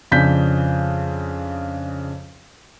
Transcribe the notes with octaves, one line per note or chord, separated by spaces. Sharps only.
F2 C#3 D4 G6 B6